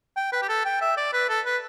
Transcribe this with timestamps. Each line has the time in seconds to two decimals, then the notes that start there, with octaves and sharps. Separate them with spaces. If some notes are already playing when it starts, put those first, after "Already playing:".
0.17 G5
0.32 B4
0.42 G4
0.49 A4
0.65 G5
0.81 E5
0.97 D5
1.13 B4
1.29 A4
1.46 B4